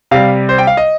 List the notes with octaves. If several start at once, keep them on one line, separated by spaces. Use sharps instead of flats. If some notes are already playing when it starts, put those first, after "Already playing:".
C3 G3 F5
C5
G5
F5
D#5